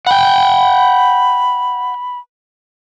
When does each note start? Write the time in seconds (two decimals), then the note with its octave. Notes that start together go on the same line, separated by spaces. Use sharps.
0.07 F#5 G5 B5